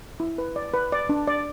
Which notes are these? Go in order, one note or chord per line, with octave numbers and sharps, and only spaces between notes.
E4
B4
D5
B4
D5
D4
D5